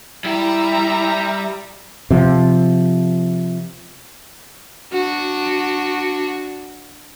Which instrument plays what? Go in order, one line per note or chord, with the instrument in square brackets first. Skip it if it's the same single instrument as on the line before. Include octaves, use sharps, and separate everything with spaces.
[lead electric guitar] G3 G5 [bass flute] E4 [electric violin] E5 A#5
[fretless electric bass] C3 F3
[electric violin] D4 F#4